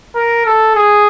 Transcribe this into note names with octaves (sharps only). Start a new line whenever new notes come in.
A#4
A4
G#4